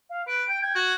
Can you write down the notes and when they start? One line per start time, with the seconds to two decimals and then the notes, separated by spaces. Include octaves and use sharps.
0.10 F5
0.27 B4 D7
0.49 G5
0.62 G5 G#6
0.75 F#4